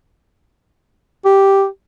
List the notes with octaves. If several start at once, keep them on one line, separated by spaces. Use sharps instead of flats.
G4